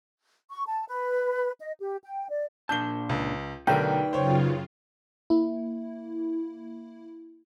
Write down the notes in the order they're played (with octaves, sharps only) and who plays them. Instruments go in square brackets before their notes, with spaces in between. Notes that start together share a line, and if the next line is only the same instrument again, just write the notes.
[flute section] C#6
A5
B4
D#5
G4
G5
D5
[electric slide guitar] A#2 D4 A5 [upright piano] G6 G7
[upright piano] C#2
[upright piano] B1 D3 A#4 [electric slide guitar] D#4 B4 D5 [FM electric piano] G5
[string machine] F#2 C#3 F4 [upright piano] C5 C#5
[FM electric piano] A#3 E4